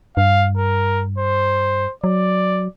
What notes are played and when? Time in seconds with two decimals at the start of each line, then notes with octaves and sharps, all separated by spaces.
0.17 G2 F5
0.57 A#4
1.18 C5
2.04 F#3 D5